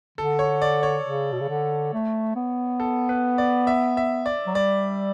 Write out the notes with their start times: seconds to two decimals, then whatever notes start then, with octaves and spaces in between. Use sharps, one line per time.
0.18 D3 A4
0.39 C#5
0.62 D5
0.83 C#5
1.05 C#3
1.32 B2
1.41 C#3
1.49 D3
1.93 A3
2.36 B3
2.80 A4
3.09 B4
3.38 D5
3.67 E5
3.97 E5
4.26 D5
4.46 F#3
4.54 G3 D5